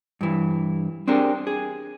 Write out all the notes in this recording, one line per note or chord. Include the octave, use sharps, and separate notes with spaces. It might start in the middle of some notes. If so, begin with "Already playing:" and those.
G2 E3
C4 D4 G4 G#4 A#4
G#4